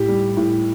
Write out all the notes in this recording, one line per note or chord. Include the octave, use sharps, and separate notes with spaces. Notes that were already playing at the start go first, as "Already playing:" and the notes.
Already playing: A2 G4
G3
A2